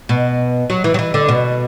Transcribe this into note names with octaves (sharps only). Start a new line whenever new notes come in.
B2
F#3
E3
F#3
E3
D3
B2